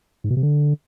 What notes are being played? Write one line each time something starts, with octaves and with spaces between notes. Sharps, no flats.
G#2
B2
C3
D3